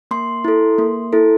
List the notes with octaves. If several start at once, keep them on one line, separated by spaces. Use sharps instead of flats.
A#3 C6
E4 A4
A#3
E4 A4